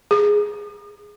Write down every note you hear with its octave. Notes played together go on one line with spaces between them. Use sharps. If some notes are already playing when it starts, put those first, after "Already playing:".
G#4